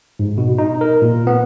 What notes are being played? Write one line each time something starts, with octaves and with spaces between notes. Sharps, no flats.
G#2
B2
D#4
A#4
A#2
B3